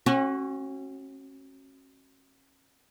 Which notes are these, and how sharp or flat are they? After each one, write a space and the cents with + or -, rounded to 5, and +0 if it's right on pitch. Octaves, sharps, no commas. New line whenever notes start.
C#4 -35 F#4 +15